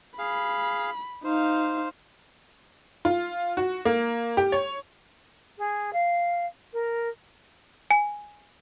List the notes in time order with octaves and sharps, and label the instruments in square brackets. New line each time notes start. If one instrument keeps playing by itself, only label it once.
[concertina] G#4 F5 [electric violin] B5
[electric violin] D#4 F5 [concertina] C5
[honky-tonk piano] F4
F#4
A#3
G4
C#5
[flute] G#4
F5
A#4
[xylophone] G#5